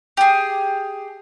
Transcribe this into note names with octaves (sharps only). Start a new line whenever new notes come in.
G4 G#4